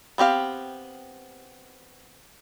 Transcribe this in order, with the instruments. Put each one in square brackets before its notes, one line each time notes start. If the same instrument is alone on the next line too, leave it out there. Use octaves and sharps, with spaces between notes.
[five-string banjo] B3 C4 G4 F5